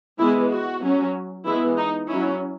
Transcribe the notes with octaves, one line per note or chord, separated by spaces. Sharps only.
E3 G#3 B3 E4
F#4
F#3 C#4
E3 G#3 B3 E4
D#4
F#3 C#4 E4